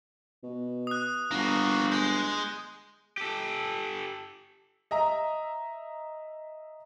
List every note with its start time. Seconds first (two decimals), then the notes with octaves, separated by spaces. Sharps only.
0.43 B2
0.87 D#6 F#6
1.31 G1 A#3 F#4
1.92 G#3 G6
3.18 G4 A4
4.91 D#5 E5 A#5